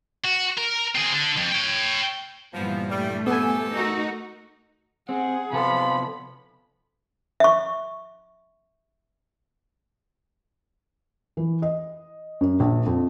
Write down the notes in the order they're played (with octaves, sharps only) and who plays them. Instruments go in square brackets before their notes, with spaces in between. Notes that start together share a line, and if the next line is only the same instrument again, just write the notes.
[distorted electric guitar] F#4
A#4
C4 G#4
D3 D4
F2
C#5 G5
[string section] G2 A#2 E3 [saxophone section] F3 [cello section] B3
[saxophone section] G3 [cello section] A3
[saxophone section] F3 G4 A4 [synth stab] B3 G#5
[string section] A3 A#4 [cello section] D#4 F#4
[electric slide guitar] C4 [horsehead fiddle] G#4 F#5
[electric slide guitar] C3 B3 A4 [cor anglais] F3 [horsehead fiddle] B5
[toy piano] E5 C#6
[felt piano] E3
D#5
F#2
A#1
F2